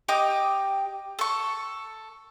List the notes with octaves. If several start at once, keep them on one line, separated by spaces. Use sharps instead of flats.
G4 D#5 G5 D6
A4 C#6